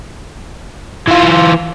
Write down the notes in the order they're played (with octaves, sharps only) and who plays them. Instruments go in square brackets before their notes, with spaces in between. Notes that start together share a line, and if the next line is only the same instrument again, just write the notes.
[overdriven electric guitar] E3 F4